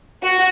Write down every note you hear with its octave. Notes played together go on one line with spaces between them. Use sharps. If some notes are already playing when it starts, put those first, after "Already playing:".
F#4